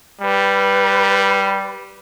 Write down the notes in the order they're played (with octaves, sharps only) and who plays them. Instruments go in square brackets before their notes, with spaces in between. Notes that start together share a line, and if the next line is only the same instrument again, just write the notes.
[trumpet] G3 [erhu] B4